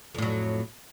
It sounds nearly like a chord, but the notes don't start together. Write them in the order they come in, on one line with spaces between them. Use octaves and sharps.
F2 A2 F#3